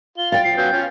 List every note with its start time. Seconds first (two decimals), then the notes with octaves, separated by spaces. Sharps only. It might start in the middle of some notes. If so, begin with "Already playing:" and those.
0.18 F4 G7
0.32 F5 G5 A6
0.44 F3 C7
0.57 F#3 B3 C#4 G6
0.73 C#4 F4